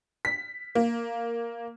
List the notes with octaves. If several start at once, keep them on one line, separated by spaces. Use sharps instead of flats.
B6
A#3